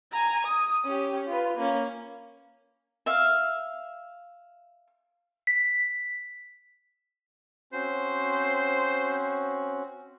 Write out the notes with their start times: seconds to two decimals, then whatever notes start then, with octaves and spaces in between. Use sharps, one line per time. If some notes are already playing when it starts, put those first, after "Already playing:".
0.12 G#5 A#5
0.45 D#6
0.85 C#4 G4
1.28 F4 B4
1.57 A#3 C#4
3.06 E5 F5
5.47 B6
7.73 C4 C#4 F#4 C5